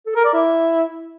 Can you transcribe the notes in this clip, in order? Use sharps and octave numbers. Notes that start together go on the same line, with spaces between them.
A4
A#4
D5
E4